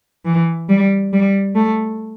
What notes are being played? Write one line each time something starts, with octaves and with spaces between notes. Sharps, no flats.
E3
G3
G3
A3